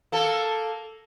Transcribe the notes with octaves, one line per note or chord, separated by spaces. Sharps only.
A#3 A4